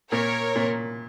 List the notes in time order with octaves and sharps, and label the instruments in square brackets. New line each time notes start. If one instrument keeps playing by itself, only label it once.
[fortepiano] A#2 [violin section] A#4 C#5
[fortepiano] A#2